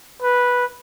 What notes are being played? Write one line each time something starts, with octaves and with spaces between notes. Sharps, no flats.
B4